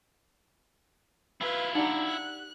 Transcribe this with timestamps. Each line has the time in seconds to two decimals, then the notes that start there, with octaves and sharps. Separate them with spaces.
1.41 E4 F4 B4 F5
1.75 D4 D#4 G4 D5 F#5 A#5
2.07 F#6